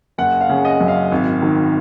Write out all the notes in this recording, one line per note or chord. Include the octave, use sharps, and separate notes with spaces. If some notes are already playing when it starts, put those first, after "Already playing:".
F#1 F#5
F5
C#3
D#5
F#2
F5
G#1
D#3